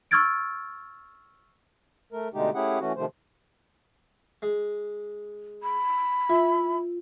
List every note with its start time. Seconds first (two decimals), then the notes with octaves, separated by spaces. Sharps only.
0.11 C#6 E6 F6 G#6 A6 D7
2.13 A3 A#4
2.34 B2 D3 G#3 A3 D#4 G4
2.55 A3 C#4 E4 G4 G#4 F#5
2.80 E3 A3 C#4 F#4
2.96 C3 D#3 F3 A3 C5
4.42 G#3
5.63 B5
6.29 E4 F4